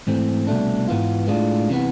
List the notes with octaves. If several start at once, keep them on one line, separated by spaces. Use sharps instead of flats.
G#2 E3 A3 C4
C2 B2 A3 D4
G#2 E3 B3 F4
A2 G#3 D4 F4
C3 E3 B3